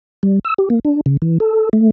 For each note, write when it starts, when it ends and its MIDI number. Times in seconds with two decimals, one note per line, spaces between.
0.23 0.39 55
0.45 0.54 88
0.58 0.69 67
0.70 0.79 58
0.85 1.01 62
1.06 1.17 49
1.22 1.38 52
1.40 1.69 69
1.73 1.90 57